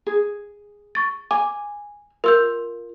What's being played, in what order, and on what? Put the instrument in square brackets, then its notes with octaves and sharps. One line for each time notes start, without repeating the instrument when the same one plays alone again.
[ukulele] G#4
[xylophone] C#6 A6
[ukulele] G#5 [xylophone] D6
[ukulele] F4 [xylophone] A#4 E6 G6